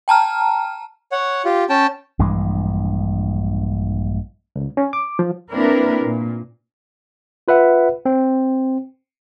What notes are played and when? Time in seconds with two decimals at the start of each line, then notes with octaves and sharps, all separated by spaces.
0.08 G5 A5 A#5 F6
1.12 C#5 F#5
1.45 F4 G4
1.69 C#4 G5 A5
2.19 A#1 G2 E3 G#3
4.56 C#2
4.77 C#4
4.93 D6
5.19 F3
5.53 A#3 C4 D4 E4 A#4 B4
6.03 A#2
7.48 F4 B4 E5 F#5
8.06 C4